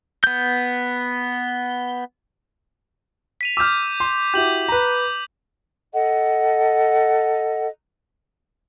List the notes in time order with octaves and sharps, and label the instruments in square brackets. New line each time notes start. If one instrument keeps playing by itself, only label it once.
[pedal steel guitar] B3 G6
[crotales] B6 D#7 F7
[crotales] D6 G6 [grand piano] E6 F6
[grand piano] C6
[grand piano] E4 F#4 G4 [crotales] G6 F#7
[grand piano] B4 A#5
[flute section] A4 D#5 F#5